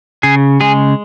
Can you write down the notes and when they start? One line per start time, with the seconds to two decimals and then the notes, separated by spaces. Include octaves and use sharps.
0.23 C#3 G#4
0.61 G#3 G#4